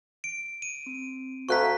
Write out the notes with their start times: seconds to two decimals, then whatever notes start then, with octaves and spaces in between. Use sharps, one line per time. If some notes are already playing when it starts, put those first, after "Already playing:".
0.24 D7
0.62 D#7
0.86 C4
1.49 D2 F5 A#5 C#6 F#6 B6